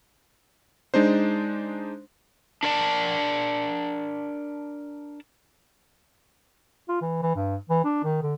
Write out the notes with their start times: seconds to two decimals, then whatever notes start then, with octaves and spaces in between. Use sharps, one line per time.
0.94 G#3 D4 D#4 C5
2.63 D4 A#4 D5 A5
6.88 F4
7.01 E3
7.22 E3
7.35 G2
7.69 E3
7.84 D4
8.04 D#3
8.22 D3